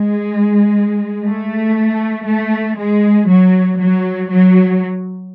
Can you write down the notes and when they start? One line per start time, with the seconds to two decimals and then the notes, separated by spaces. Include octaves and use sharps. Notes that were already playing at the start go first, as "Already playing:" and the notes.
Already playing: G#3
1.25 A3
2.26 A3
2.77 G#3
3.28 F#3
3.79 F#3
4.30 F#3